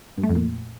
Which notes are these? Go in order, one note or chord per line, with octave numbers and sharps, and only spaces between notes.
G2
A3
F2
A#2